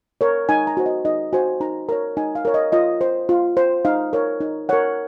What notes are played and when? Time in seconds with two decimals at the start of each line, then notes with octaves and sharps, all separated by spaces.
0.21 A#4 C#5
0.49 D#4 G#5
0.67 A#5
0.77 F#4 C5
0.86 D#5
1.05 D#4 D#5
1.33 F#4 C5 G#5
1.61 D#4 A#5
1.89 A#4 C#5 A#5
2.17 D#4 G#5
2.35 F5
2.45 A#4 C#5
2.54 D#5
2.72 F4 D#5
3.01 C5
3.29 F4
3.57 C5
3.85 D#4 F5
4.13 A#4 C#5
4.41 D#4
4.69 A#4 C#5 F#5